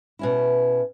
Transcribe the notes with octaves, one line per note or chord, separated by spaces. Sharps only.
B2 C#4 E4